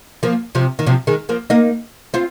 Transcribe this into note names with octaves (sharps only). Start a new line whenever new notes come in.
F3 A#3
C3 F3
D#3
C3 F3
D#3 G#3
F3 A#3
A#3 D#4
C4 F4